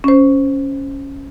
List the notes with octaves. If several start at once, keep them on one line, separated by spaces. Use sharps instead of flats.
C#4 C5